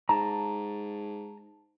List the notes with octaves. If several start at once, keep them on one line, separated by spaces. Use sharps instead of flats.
G#2 A5 A#5